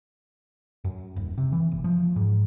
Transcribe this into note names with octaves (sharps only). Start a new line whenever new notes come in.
F#2
D#1
C3
E3
F#1
F3
G#2